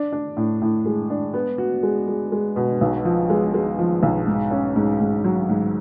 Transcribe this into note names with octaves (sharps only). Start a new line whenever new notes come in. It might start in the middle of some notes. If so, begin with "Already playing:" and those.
Already playing: D4
D4
A2
A2
G#3
D4
B3
F#4
G#3
G#3
G#3
B2
B1
F3
G#3
G#3
F3
B1
G#2
C#4
G#2
G#2
F#3
G#2